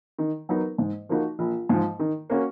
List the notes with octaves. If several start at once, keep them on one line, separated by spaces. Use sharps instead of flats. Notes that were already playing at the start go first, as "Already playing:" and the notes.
D#3
F#3 B3 D#4 A#4
G#2
F3 A#3 D#4 F#4
A#1
G#2 F3
D#3
A#3 C#4 F#4